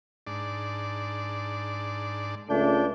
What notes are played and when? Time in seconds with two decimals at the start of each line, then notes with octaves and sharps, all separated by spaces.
0.27 G#2 D4 D5
2.50 C#2 A3 D4 G5